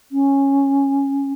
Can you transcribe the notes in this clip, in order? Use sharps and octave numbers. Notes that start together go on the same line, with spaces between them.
C#4